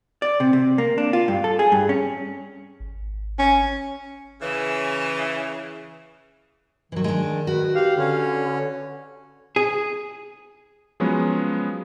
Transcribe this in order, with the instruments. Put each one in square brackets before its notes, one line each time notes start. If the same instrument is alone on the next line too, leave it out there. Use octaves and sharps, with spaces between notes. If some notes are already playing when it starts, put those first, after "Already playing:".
[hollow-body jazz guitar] D5
C3
C3
A#3
D4
F4
G2
A4
G#4
G2
C#4
[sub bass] G#1
[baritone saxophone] C#4
[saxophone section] C#3 E3
[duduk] D#3 [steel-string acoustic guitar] E3 F#3
[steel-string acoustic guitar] G#3 D4
F#4 B4
[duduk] G4 [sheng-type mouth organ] F5
[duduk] D3 [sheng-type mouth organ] C#4
[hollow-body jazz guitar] G#4
[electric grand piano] F3 F#3 G#3 B3 C#4